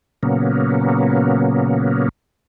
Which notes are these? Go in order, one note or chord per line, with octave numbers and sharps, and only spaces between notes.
A#2 C#3 F#3 A#3 B3 C#4